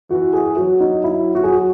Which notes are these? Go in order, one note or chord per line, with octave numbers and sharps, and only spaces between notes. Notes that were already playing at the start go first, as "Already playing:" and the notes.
E3 F#4
G#4
F#3 F#4
D#4
E4
F#4
G#4
F#4